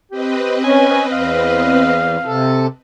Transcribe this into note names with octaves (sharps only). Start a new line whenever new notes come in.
C4 G4 B4 D#5
C#4 G#5
E2 F5
C3 A4